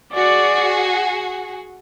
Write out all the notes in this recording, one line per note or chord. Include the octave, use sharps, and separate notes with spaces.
F#4 G#4 D5